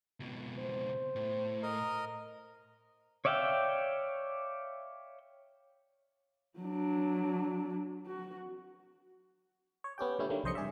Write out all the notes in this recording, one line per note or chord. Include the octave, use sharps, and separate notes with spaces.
C#2 B2
C5
A2
A#4 D#5
C#5 D5 E5 F5 G5
F#3 D4
F#4
C#5
B3 C#4 G4 G5
A#2 D3 G3 G#3 C#4 E4
D3 D#3 G3 A3 A#3 D4
C2 F2 C5 D#5 C6 C#7
G2 G#4 D5 E5